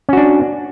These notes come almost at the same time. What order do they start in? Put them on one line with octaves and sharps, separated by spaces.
C#4 F#4 D4